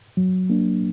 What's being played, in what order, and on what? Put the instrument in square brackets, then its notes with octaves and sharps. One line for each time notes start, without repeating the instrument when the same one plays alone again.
[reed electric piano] F#3
A#3 D4